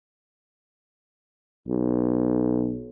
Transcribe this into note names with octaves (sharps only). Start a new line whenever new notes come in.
B1